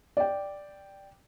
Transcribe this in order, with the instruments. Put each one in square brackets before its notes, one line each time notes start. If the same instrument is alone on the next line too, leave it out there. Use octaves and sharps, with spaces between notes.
[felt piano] D5 G5